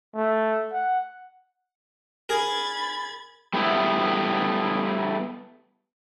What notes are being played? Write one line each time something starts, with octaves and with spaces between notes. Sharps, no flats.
A3
F#5
G#4 A#4 B5 G#6 A6
G3 A3 B3 E4